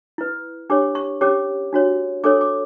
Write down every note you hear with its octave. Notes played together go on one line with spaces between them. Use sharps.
E4 B4
D4 G4 C#5 D6
C#6
C#4 G4 C#5 D6
D4 F#4 C#5
D4 A4 C#5 D6
D6